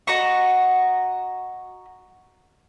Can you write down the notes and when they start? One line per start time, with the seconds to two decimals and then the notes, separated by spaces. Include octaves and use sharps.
0.07 F#4 D#5 A#5 C#6